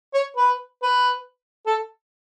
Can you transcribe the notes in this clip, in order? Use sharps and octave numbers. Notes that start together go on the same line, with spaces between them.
C#5
B4
B4
A4